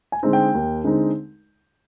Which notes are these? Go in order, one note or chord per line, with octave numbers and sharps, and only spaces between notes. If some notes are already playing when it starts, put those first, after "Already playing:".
G#5
D3 G#3 C4 D#4
G5
D#2
D3 G#3 C4 D#4